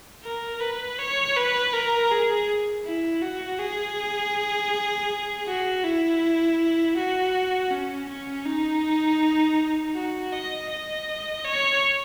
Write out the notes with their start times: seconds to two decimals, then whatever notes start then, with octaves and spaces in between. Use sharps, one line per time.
0.24 A#4
0.60 B4
0.99 C#5
1.36 B4
1.73 A#4
2.11 G#4
2.85 E4
3.22 F#4
3.59 G#4
5.47 F#4
5.84 E4
6.97 F#4
7.70 C#4
8.08 C#4
8.45 D#4
9.95 F#4
10.33 D#5
10.70 D#5
11.44 C#5